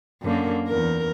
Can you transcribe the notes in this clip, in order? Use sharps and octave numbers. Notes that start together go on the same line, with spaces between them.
F#2 D3 A#3
E2 A#4